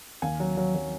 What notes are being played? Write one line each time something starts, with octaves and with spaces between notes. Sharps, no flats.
D#2 F5 G#5
F#3
F#3
F#3